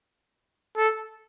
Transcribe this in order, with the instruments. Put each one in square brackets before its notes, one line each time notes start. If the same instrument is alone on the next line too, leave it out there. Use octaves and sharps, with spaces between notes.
[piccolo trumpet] A4